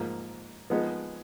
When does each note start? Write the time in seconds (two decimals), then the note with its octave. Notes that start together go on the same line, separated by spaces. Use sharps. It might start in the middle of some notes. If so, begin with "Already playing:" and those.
Already playing: G#2 F3 A#3
0.70 F3 G#3 B3 D#4